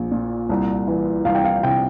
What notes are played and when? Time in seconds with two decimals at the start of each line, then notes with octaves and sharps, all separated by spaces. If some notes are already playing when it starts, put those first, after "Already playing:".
Already playing: A#1
0.12 A#2
0.49 C2
0.87 E3
1.25 C2 F5
1.35 G5
1.44 F5
1.63 C3 G5